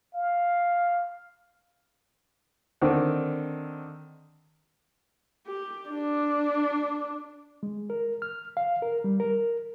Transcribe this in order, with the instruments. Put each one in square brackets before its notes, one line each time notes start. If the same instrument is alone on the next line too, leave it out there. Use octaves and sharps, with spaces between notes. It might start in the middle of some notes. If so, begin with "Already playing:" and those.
[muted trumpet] F5
[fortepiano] D3 D#3 C4
[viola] G4
D4
[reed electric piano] G#3
A#4
F6
F5
A#4
G3
A#4